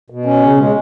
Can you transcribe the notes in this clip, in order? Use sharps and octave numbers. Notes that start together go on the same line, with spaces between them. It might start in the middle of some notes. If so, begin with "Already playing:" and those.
B2
C#4
C#3
G#3